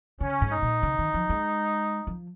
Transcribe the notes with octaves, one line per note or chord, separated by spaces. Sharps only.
C#3 C#4
G#2
D#4
A#2
C#3
D#3
F3
G#3
F3